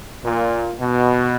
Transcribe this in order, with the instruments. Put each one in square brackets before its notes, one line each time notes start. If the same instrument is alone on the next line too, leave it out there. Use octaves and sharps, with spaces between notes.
[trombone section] A#2
B2